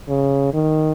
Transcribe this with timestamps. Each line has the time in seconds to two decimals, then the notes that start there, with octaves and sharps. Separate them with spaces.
0.09 C#3
0.53 D#3